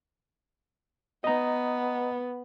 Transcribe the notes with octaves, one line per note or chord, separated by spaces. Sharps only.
B3 D#5 A#5